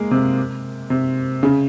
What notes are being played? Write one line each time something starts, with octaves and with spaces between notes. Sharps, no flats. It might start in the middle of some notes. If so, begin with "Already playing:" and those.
Already playing: G#3 A#3
C3
C3
C#3